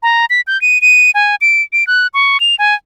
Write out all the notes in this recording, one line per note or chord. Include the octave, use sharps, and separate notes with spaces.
A#5
B6
G6
D#7
D#7
G#5
D7
D7
F#6
C#6
F7
G#5